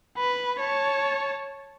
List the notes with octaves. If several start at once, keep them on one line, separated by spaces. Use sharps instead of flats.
B4
C#5 A5